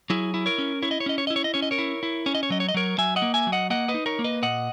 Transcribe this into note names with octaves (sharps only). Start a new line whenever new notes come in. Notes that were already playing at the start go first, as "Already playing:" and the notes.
F#3 E4 G#4
E4
A#4 C#5
C#4
E4 C#5
D#5
C#5
C#4 D#5
C#5
E4 D#5
C#5
D#5
C#4 C#5
D#5
A#4 C#5
E4
E4
C#4 C#5
D#5
C#5
F#3 D#5
C#5
D#5
F#3 A#4 C#5
F#3 E5 G#5
D#5 F#5
A#3
E5 G#5
F#3
D#5 F#5
A#3 D#5 F#5
B4 D#5
D#4
A#4 C#5
A#3
B4 D#5
A#2 D#5 F#5